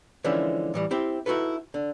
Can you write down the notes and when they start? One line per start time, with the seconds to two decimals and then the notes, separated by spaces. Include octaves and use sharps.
0.24 D3 E3 F3 G#3 C#4 E4
0.74 A2 E3 G3
0.91 C4 E4 G4
1.26 D#4 E4 F#4 A4 B4
1.74 D3